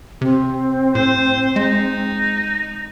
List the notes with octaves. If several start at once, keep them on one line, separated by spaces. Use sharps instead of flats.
C3 C4
A2 C5
G#3 D#4